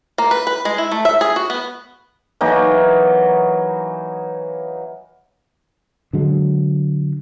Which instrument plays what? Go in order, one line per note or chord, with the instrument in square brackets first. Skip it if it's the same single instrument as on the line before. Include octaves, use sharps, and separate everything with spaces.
[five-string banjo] A#3
B4
B4
G#3
E4
A3
E5
G#4
F#4
B3
[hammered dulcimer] E3 F#3 A#3 D#4
[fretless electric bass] D3 F#3 G#3